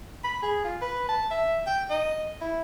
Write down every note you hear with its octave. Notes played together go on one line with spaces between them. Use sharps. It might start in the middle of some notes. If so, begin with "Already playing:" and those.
B5
G#4
F4
B4
A5
E5
G5
D#5
E4